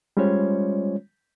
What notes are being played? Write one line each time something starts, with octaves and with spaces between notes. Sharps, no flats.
G3 G#3 C#4 F4 C5 C#5